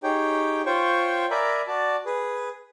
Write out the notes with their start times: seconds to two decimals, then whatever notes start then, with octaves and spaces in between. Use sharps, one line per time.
0.03 D#4 G4 G#4 C#5 G5
0.66 F4 C5 C#5 G5 C#6
1.31 A#4 D5 E5 G#5 A#5 B5
1.67 F#4 D5 A5
2.06 G#4 B4